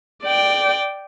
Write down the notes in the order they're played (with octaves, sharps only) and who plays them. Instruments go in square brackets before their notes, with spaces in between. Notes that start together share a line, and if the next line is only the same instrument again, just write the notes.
[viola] D5 G5